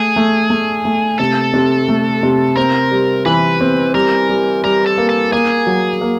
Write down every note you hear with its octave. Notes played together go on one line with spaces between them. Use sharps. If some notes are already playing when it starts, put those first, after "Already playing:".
Already playing: A3 G#4
A3
A3
A3
C3 A4
C3
A3
C3
C4 A#4
G3
E3 B4
C4
G3 A#4
G3
G3 A#4
A4
A#3
A4
A#3 G#4
F#3
A#3